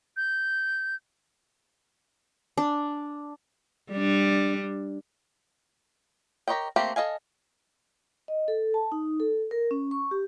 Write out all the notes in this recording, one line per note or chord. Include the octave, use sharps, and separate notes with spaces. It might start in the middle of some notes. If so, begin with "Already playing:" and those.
G6
D4
G3 D4
G4 A#4 C#5 D#5 G5
A3 A#3 C4 G4 A#5
A4 D#5 F5 G#5
D#5
A4
A5
D#4
A4
A#4
C#4
C#6
G4